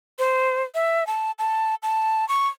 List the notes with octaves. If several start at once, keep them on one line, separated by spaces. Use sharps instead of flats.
C5
E5
A5
A5
A5
C#6